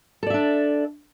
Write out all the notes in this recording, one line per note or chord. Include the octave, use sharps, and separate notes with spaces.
D4 A4 D5 E5